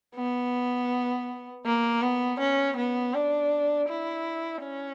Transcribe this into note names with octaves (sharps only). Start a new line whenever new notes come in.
B3
A#3
B3
C#4
B3
D4
E4
C#4